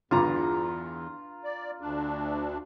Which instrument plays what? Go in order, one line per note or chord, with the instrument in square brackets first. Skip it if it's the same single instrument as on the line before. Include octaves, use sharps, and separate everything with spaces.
[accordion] E2 [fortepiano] G2 D3 [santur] F4 A#5
[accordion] D5
D2 D4